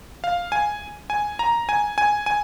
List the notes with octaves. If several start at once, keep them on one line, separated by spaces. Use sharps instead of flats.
F5
G#5
G#5
A#5
G#5
G#5
G#5